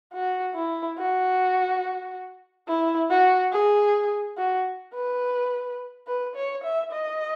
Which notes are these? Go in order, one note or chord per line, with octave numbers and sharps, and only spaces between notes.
F#4
E4
F#4
E4
F#4
G#4
F#4
B4
B4
C#5
E5
D#5